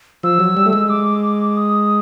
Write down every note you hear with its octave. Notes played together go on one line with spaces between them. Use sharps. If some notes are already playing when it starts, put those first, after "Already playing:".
F3 E6
F#3
G3
A3
G#3
D6
D#6